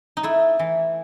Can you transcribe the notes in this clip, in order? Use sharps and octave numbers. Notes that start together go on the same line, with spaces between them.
D#4
A3 E4
E3